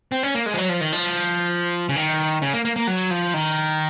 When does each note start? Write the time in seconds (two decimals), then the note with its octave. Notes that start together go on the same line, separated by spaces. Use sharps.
0.12 C4
0.23 C#4
0.35 A#3
0.46 G#3
0.54 F3
0.58 F#3
0.69 F3
0.81 D#3
0.92 F3
1.89 C#3
1.96 D#3
2.42 C#3
2.53 A#3
2.65 A#3
2.76 A#3
2.87 F#3
3.11 F3
3.34 D#3